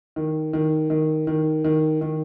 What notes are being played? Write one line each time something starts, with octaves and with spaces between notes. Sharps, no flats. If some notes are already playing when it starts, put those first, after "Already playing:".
D#3
D#3
D#3
D#3
D#3
D#3